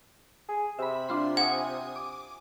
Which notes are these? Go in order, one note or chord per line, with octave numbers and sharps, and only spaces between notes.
G#4
C3 E5 B5
D4 F4 C6
F#5 G#5 D#6
D6